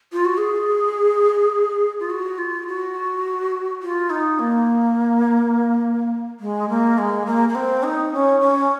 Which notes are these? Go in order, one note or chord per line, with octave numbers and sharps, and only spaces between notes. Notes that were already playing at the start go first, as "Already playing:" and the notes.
F4
F#4
G#4
F4
F#4
F4
F#4
F4
D#4
A#3
G#3
A#3
G#3
A#3
A#3
C4
D#4
C#4
C#4